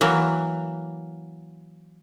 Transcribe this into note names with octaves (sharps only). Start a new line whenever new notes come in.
E3 F#3 A#3